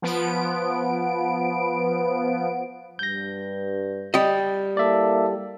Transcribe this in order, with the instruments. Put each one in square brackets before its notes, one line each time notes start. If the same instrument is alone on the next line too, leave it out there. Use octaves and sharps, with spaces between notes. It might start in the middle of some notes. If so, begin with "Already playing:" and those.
[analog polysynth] F3 B3 D7
[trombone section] G2 [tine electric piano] G6 A#6
[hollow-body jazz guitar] G3 D#5
[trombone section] A#3 E4 A4 [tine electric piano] D5 E5